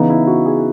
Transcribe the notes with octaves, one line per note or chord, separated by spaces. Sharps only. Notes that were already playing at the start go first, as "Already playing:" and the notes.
Already playing: C#3 E3 B3 D#4
E4
F#4
G#4